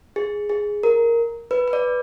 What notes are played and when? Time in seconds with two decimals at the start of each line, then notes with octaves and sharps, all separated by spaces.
0.16 G#4
0.49 G#4
0.83 A#4
1.51 B4
1.68 B4
1.73 D5